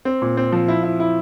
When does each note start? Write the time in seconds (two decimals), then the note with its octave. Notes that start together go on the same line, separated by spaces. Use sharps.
0.05 C4
0.22 A#2
0.37 C4
0.52 F3
0.68 E4
0.83 E4
1.00 E4